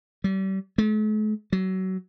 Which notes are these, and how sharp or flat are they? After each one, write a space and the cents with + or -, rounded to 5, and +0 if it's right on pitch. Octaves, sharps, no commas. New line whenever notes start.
G3 -35
A3 -45
F#3 +25